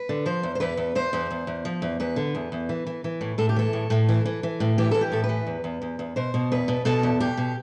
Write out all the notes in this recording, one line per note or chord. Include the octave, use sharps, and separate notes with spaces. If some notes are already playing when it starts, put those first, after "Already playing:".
Already playing: B4
D3
F3 C5
E2
C5
E2 B4
E2
E2 C5
E2
E2
E2
F3
E2
E2 B4
D3
E2
E2
E3
E3
E3
A2
A2 A4
G4
E3 A4
A2
A2
E3
E3
E3
A2
E3 G4
E3 A4
G4
A2 A4
B4
E3
E2
E2
E2
E2
B2 C5
B2
E2 B4
B2
B2 A4
E2
B2 G4
B2